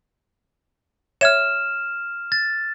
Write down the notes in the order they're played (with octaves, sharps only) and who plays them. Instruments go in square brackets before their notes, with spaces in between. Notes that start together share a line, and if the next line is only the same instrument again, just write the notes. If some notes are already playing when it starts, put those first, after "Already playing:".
[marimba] C#5 E5 G#6 [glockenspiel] F6 E7
[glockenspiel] A6